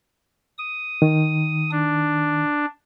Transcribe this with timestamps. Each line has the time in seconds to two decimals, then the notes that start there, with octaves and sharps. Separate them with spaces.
0.58 D#6
1.02 D#3
1.71 D4